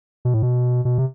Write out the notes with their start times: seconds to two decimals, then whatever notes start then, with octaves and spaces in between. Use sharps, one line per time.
0.25 B2
0.34 A2
0.43 B2
0.85 B2
0.98 C3